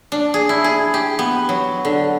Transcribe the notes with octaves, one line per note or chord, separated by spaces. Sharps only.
D4
G#4
E4
G#4
G4
B3
F#3
D3